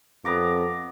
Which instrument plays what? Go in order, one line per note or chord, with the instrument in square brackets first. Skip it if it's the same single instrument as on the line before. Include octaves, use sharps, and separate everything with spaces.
[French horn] F2 [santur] B3 A#5 D6